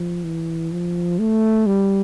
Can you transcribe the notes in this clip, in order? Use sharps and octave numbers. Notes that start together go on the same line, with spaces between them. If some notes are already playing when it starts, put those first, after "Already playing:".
Already playing: F3
E3
F3
A3
G3